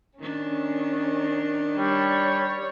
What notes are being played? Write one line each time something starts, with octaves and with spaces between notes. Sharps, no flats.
D#3 C#4 D4
G3 C#5